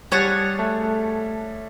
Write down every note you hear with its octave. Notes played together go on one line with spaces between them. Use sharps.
G3 G#4 C#5 F#5 A5
A3
A3